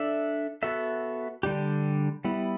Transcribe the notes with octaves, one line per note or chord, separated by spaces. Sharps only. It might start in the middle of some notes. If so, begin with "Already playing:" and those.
Already playing: D4 A4 E5
B3 F#4 A4 E5
D3 G3 D4 G4
G3 B3 E4